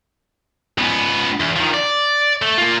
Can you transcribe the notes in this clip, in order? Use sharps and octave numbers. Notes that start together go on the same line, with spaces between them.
C#2 B3
E2
D#3 F3
D5
A3
A#3 F4